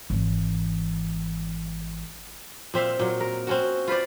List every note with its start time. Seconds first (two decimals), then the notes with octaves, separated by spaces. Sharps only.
0.10 G#1 E3
2.74 A#2 C4 E5 F5
2.99 A#2 F#3
3.21 A#4
3.47 C4 C#4 F#4
3.88 F4 B4 C5 D5